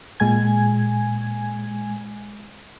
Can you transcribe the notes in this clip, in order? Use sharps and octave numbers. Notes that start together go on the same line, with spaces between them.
A#2 G#3 G#5 G#6